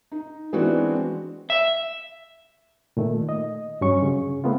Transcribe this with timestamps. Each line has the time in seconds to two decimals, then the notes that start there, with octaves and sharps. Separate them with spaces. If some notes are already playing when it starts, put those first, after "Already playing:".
0.12 D#4
0.53 E3 G#3 B3 C4 D4 F#4
1.50 E5
2.97 A#2 D#3 A3
3.29 D#5
3.81 G2 F#3 C#4 C#6
4.02 C#3
4.44 A3 B3 C4 F4